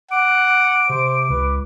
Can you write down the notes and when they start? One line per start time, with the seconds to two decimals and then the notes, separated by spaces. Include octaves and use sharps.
0.11 F#5 D6 D7
0.89 C3 C5
1.30 C#2 B4